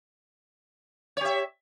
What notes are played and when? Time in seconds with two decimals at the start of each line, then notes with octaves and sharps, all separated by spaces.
1.17 C#5
1.21 G4
1.25 E5